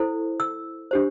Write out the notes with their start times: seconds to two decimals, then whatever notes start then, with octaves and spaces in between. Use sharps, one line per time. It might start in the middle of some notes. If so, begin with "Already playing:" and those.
Already playing: E4 A4 C5
0.40 E6
0.91 D4 G4 C5